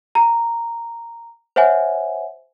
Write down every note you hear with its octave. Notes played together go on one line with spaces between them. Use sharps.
A#5
C5 C#5 E5 F#5 G#5